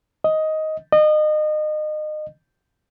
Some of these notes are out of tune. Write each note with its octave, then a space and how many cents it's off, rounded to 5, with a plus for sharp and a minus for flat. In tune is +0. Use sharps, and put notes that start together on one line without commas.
D#5 +10
D#5 -30